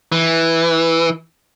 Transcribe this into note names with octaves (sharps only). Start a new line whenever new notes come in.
E3